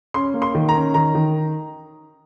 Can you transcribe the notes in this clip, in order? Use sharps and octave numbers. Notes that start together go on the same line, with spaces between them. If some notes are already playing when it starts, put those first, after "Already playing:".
C#4 C6
A#3
C6
D#3
A#5
C#4
D#3 A#5
D#3